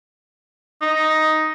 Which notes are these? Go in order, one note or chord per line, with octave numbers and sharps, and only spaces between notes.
D#4